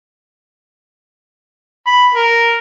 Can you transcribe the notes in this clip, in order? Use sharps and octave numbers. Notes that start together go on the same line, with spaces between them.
B5
A#4